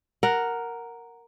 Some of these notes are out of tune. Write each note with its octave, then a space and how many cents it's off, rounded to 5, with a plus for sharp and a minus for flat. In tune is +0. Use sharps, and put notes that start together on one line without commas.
A#4 +0 F#5 +0